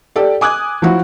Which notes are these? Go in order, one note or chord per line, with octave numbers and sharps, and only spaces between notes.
G4 A4 D5
G#5 D6 D#6 F#6 G#6
F3 F#3 E4 F#4